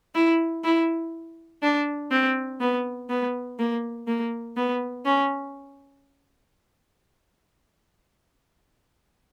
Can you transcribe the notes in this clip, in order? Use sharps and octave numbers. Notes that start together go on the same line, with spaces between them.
E4
E4
D4
C4
B3
B3
A#3
A#3
B3
C#4